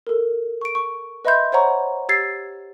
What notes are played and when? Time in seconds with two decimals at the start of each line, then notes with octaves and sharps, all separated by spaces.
0.07 A4 A#4
0.61 C#6 D7
0.75 C#6
1.25 B4 D#5 E5 B5 C6 G6
1.52 C5 C#5 F#5 A#5 C#6
2.09 G4 E6 G#6 A6 C7